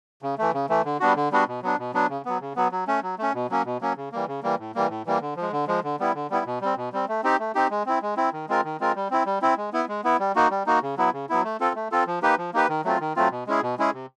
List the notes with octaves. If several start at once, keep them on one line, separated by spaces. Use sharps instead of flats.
C#3
E3 A3
C#3
E3 A3
D3
G3 B3 D4 F#4
D3
G3 B3 D4 F#4
B2
F#3 B3 D4
B2
F#3 B3 D4
C#3
F#3 B3
C#3
F#3 B3
F#3
A3 C#4
F#3
A3 C#4
B2
F#3 A#3 C#4
B2
F#3 A#3 C#4
C#3
E3 G3 A#3
C#3
E3 G3 A#3
A2
E3 G3 A#3
A2
E3 G3 A#3
D3
F3
G#3
D3
F3 G#3
D3
G3 B3 E4
D3
G3 B3 E4
B2
G3 C4
B2
G3 C4
A3
C4 D#4 G4
A3
C4 D#4 G4
G#3
C4 E4
G#3
C4 E4
D#3
G#3 C4 F4 A#4
D#3
G#3 C4 F4 A#4
G3
C4 E4
G3
C4 E4
G#3
B3 E4
G#3
B3 E4
G3
A#3 D#4 F#4
G3
A#3 D#4 F#4
C#3
F#3 B3 E4
C#3
F#3 B3 E4
A3
C4 F4 A4
A3
C4 F4 A4
F3
A#3 D#4 G4 B4
F3
A#3 D#4 G4 B4
D#3
F#3 A3 C4 F4
D#3
F#3 A3 C4 F4
B2
G#3 C#4 E4 G#4
B2
G#3 C#4 E4 G#4
C3